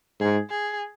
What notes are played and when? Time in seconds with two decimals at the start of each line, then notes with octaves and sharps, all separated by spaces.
0.20 G#2 G#4
0.50 G#4